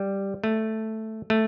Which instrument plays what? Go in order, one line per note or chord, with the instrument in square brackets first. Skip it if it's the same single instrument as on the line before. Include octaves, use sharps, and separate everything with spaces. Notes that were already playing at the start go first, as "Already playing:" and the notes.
Already playing: [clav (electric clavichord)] G3
A3
A3